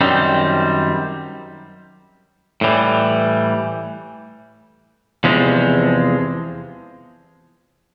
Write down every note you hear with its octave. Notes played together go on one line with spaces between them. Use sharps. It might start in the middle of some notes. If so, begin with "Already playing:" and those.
F#2 D#3 G3 C4
A2 E3 G3
E2 C3 F3 G#3